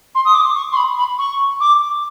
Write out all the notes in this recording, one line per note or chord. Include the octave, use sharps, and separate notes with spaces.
C6
D#6
D6
C#6
C6
B5
B5
C#6
D6